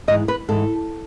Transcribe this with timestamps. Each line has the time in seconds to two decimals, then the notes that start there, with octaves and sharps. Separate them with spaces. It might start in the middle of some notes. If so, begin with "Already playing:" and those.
0.08 G#2 E3 D#5
0.28 B4
0.49 G#2 E3 A4